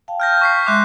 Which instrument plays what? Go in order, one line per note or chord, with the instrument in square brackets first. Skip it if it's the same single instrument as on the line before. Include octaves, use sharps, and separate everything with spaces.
[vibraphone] F5 G5 A5
[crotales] F6 G6 A#6
C#6 B6 C7
[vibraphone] G#3 E5 C6 [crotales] D6 F#6